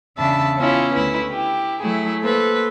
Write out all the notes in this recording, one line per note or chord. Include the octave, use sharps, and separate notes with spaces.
E2 C#3 D4 E5 A5 B5
B3 C#4 E4 F4
D2 E4 B4
E4 G4
F#3 A3 E4 G#4
A#3 A4 B4 C5